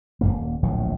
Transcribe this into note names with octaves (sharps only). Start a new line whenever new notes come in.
D#1 C#2 A#3
D1 A#1 A2 F#3